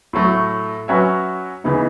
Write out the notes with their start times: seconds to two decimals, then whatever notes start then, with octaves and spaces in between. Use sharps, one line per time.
0.13 A2 F#3 A3
0.88 F#3 C#4 F#4 B4 E5
1.64 C#3 E3 B3 D#4